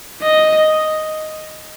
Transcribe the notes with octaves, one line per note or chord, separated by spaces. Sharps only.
D#5